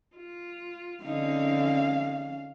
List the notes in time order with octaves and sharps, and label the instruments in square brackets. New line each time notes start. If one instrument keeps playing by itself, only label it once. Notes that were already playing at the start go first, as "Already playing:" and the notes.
[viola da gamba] F4
[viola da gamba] D3 C4 D#4 [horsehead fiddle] C#4 F5